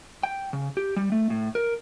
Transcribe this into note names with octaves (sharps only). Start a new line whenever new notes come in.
G5
C#3
G4
G3
A3
A2
A#4